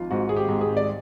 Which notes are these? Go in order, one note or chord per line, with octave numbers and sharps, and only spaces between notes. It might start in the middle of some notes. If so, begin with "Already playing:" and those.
Already playing: G#1 F3 F4
G#2 F#4
G#4
G4
G#2
G#4
D5